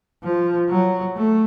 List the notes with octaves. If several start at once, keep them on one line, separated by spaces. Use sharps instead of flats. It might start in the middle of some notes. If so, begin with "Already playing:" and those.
F3
F#3
A3